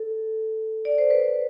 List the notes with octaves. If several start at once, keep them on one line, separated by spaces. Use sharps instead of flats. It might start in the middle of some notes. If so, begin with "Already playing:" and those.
Already playing: A4
D5
C5
B4